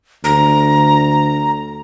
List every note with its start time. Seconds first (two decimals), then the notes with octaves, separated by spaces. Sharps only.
0.24 D2 A#5